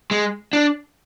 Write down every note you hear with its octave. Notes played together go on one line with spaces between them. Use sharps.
G#3
D4